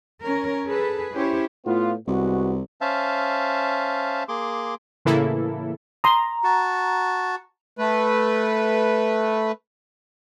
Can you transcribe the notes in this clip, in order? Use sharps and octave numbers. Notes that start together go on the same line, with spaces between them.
C#4 A#4
G#4 A4 B4
C#4 E4 G4 C5 C#5
A2 B3 F4
C2 G#3 B3 F#4
C#4 C5 E5 F5 A5
A#3 G#4 C6 D6
A2 C#3 E3 A#3 E4 A4
A#5 C6 D#6
F#4 A5
A3 B4